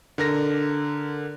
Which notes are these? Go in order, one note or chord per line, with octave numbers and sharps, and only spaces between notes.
D3 A#4 A#6